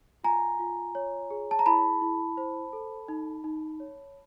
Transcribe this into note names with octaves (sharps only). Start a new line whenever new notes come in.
F4 G#5 A#5
F4
C#5
G#4
A5
A#5
E4 A5 B5
E4
C5
A4
D#4
D#4
C#5